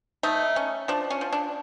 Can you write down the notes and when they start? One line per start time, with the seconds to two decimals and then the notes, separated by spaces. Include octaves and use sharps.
0.23 A3 D#4
0.56 C#4
0.88 F3 D4
1.10 C#4
1.21 F3
1.33 D4